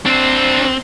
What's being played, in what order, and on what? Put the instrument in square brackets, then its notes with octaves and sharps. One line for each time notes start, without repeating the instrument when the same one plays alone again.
[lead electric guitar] C4 [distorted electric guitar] D4 C5